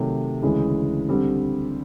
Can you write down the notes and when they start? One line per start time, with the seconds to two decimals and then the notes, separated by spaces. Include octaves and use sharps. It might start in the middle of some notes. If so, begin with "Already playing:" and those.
Already playing: C3 D#3 F#3 A3
0.42 D2 C#3 E3 G#3
1.09 D3 G3 C4